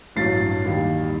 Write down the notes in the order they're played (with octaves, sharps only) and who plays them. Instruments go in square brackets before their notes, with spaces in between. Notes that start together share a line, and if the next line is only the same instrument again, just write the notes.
[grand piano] A1 G2 F#3 A6 C7
D#2 D#3 G3